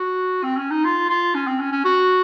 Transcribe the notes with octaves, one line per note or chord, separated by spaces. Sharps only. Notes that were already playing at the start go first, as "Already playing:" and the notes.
Already playing: F#4
C4
C#4
D#4
F4
F4
C#4
C4
C#4
C#4
F#4